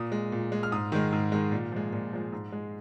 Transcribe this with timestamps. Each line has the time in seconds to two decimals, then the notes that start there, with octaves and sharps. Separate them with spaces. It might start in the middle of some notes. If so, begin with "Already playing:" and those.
Already playing: A#2 D#6
0.12 G#3
0.32 A#2
0.52 G#3
0.63 F6
0.72 G#2 D#6
0.92 D#3 G#3
1.12 G#2
1.32 D#3 G#3
1.52 A#2
1.72 F3 G#3
1.93 A#2
2.13 F3 G#3
2.33 G#2
2.52 G#3